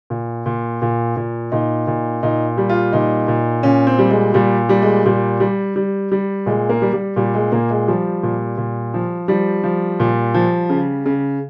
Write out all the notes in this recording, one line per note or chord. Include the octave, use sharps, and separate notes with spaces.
A#2
A#2
A#2
A#2
A#2 D#4
A#2
A#2 D#4
G3
F4
A#2 D#4
A#2
A#2 C#4
C4
G3
G#3
A#2 G3
G3
G#3
A#2 G3
G3
G3
G3
A#2 G#3
A#3
G3
G3
A#2 G3
G#3
A#2 A#3
G#3
F3 G3
A#2
A#2
F3
F3 G3
F3
A#2
F3
C#3
C#3